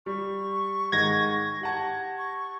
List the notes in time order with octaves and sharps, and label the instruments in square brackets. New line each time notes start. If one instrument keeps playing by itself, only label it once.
[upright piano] G3 [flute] C#6
[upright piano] G#2 D#3 [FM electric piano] G#6 A#6
[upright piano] G4 F#5 A5
[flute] C#6